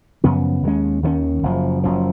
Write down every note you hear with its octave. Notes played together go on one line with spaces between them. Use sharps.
F#2 C#3 F3 B3
D#2 D#3 G#3 C#4
D#2 D#3 G#3 C#4
F#1 F#2 F3
F#1 F#2 F3